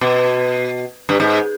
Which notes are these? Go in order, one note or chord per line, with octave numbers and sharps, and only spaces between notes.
B2
G2
G#2